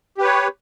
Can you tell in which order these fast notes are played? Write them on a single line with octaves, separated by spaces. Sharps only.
G4 B4 C#5